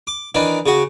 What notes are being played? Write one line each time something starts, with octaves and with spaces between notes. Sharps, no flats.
D6
D#3 E3 D4
C#3 F#4